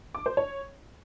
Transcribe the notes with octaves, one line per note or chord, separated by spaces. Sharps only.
D6
C5
C#5